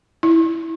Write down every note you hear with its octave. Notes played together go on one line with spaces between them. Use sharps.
E4